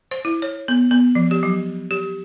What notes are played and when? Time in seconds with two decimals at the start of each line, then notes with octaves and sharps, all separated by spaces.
0.11 C5
0.25 E4
0.42 C#5
0.68 B3
0.91 B3
1.15 F3
1.31 G4
1.43 F#3
1.91 G4